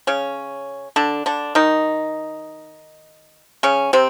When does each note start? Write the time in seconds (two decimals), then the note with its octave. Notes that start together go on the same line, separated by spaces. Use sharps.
0.07 C#3 C#4
0.96 D3 D4
1.26 D3 D4
1.55 D#3 D#4
3.63 C#3 C#4
3.93 C3 C4